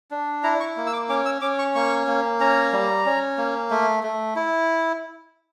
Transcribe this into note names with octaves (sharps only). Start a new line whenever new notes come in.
D4
E4 A#5
C#6
A#3
E6
D6
C#4 D6
E6
C#4 D6
C#6
A#3 C#6
A#3
C#4 A#5
G3
C#4
A#3
A3
A3
E4